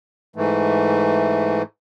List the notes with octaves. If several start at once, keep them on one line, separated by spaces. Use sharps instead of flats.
G#2 E3 A3